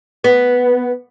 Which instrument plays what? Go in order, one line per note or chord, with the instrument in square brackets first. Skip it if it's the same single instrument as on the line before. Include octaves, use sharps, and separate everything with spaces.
[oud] B3